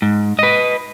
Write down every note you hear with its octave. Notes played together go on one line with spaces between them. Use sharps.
G#2
B4 D#5